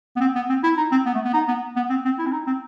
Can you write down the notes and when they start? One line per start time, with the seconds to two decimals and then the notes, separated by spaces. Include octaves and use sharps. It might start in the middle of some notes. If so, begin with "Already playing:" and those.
0.16 B3
0.21 C4
0.35 B3
0.49 C4
0.63 E4
0.77 D#4
0.92 C4
1.06 B3
1.15 A3
1.25 B3
1.33 D#4
1.48 B3
1.76 B3
1.90 C4
2.05 C4
2.19 E4
2.26 C4
2.32 D#4
2.47 C4